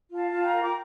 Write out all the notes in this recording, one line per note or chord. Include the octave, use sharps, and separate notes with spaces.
F4
F5 A5
F4
G5 A#5
A#4
D6